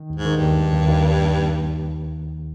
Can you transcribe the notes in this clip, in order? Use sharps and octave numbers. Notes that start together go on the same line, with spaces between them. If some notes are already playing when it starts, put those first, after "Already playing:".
Already playing: D#3
D#2
G#2
D#3
G2
D#2
A#3
D#2
D#2